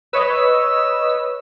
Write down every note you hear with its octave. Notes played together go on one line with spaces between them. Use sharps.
B4 C#5 D#5 E6